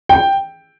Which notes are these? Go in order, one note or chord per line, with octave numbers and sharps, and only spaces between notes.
G5